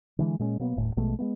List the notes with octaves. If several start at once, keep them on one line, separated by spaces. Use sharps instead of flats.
D3 E3 G#3
A#2 G#3 C4 C#4
B2 F#3 A#3 B3
D#1 A2
A#1 B2 G#3 A3
G#3 A#3 B3